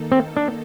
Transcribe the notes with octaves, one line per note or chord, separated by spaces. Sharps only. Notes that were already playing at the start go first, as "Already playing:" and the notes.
Already playing: D#3 A#3 D#4 A4
C4
D4